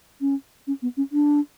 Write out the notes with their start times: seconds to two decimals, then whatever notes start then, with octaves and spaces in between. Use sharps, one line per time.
0.21 C#4
0.67 C#4
0.82 B3
0.97 C#4
1.12 D4